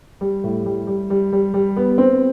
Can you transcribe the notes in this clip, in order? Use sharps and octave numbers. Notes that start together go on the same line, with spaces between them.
G3
A2
G3
G3
G3
G3
G3
B3
C4